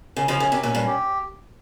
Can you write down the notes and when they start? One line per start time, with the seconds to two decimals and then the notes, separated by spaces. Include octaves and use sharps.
0.16 C#3 C#4
0.28 C#3 F3
0.40 C#3 C#4
0.52 C3
0.63 A#2 C#4
0.75 G2
0.87 G4